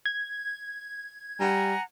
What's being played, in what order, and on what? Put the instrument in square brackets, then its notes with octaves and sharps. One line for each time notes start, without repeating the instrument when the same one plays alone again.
[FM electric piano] G#6
[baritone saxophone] G3 [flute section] F#5 G#5 A#5